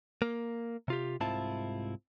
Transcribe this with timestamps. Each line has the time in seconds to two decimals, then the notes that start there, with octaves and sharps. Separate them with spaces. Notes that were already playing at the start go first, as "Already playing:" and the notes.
0.22 A#3
0.88 C3 F4 G4
1.20 C2 G#2 C4 E4 F4 A5